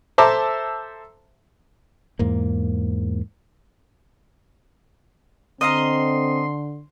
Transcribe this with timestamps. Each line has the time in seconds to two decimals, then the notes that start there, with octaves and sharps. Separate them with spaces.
0.18 A4 C5 E5 A5 A#5 D6
2.19 E2 G#2 A#3
5.61 D3 C4 D#5 F5 A#5 C6